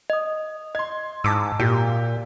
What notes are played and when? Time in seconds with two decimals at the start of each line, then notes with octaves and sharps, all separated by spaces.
0.10 D#5 D#6
0.75 D#5 C6 G#6
1.24 G#2 A5 D6 E6
1.60 A#2 G4